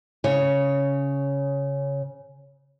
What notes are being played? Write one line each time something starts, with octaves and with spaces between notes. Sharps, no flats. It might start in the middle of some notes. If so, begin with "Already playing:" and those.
C#3 C#5